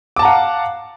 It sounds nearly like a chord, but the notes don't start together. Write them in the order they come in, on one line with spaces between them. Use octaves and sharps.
D6 A5 A#5 F#5 F5